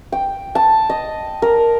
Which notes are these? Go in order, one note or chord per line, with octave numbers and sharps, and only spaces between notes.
G5
A5
D#5
A#4